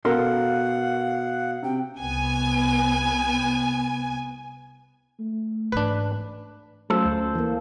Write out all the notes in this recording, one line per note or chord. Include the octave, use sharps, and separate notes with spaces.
B2 A4 A#4 F5 F#5 C6
C3 G5
C2 B3 G#5
A3
G#2 E3 D4 B4
F#3 A3 C#4 F4 A4 C5
D2
E3 A#3